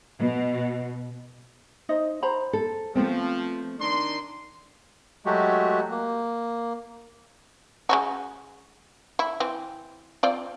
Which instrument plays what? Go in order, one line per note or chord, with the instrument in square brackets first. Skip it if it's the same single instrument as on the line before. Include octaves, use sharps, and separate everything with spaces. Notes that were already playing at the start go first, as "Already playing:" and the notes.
[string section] B2
[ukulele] D#4 C5 D#5
C5 A#5 B5
[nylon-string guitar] A4
[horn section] F3 [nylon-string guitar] A3 B3 C4
[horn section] D#3 D4 C6
[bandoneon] F#3 G#3 A3 F#4 G4
A#3
[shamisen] G#3 C#4 F#4
E4
E3 C4
C4 F4 D5